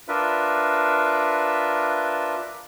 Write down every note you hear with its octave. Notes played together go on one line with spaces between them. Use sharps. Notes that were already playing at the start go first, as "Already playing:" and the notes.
D4 F4 A#4 B4 E5